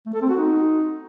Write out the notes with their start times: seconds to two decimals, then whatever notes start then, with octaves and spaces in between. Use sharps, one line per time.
0.06 A3
0.14 A4
0.21 C4
0.29 F#4
0.37 D#4